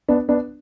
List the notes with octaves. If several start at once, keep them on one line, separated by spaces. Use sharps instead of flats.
B3 D4
B3 D4